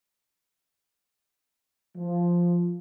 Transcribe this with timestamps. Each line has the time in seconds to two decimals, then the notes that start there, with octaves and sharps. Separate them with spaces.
1.97 F3